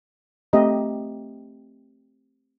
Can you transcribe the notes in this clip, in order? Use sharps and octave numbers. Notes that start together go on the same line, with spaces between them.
A3 C4 G4 D#5 E5 A#5